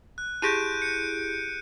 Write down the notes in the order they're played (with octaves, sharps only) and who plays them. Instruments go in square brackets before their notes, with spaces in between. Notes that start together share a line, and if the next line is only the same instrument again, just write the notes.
[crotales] F#6
[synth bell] E4 G4 G#4 [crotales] G6 D7 D#7
[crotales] C#7